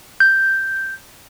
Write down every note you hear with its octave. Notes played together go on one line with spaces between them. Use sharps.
G6